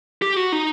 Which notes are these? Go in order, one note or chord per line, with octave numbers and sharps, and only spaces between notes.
G4
F#4
D#4